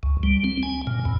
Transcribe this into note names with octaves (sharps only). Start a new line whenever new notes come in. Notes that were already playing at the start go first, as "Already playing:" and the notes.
C#2
G3
C4
G#5
A#2
E2